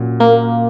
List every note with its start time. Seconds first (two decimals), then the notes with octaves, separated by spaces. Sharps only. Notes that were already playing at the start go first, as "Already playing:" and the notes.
Already playing: A#2 F#3 C#4
0.20 A#3